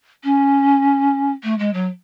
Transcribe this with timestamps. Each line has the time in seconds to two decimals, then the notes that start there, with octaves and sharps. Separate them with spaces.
0.24 C#4
1.43 A3
1.59 G#3
1.74 F#3